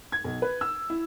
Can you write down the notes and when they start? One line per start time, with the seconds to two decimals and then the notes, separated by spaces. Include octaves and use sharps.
0.12 G#6
0.24 B1
0.42 B4
0.61 E6
0.90 E4